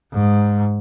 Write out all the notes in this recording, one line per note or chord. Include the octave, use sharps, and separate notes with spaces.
G#2